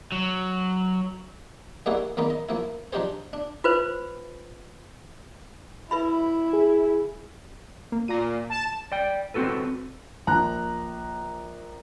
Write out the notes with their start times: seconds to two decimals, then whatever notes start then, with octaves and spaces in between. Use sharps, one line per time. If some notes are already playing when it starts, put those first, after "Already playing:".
0.12 F#3
1.86 G3 A#3 D#4 E4 F#4 G#4
2.17 E2 D#3 A#3 D#4 B5
2.30 D#5
2.49 F3 A#3 E4
2.93 F3 D4 D#4 G4 G#4 C5
3.33 D4
3.64 F4 B4 C5
5.91 E4 B4 E5 B5
6.53 G#4
7.92 A#3
8.08 A#2 A#5 D#7
8.50 A5 E7
8.92 D5 G5
9.34 C4 C#4 F#4 A4 B4
10.27 A#1 A#5 F#6